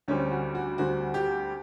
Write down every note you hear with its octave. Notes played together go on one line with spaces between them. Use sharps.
D2 D3 G3 C4 C#4
F#4
F#4
D2 D3 G3 C4 F#4
G4